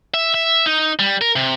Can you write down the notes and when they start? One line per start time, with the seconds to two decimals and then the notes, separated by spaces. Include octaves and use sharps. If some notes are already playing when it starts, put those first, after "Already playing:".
0.14 E5
0.34 E5
0.66 D#4
0.99 G3
1.21 A#4
1.36 C3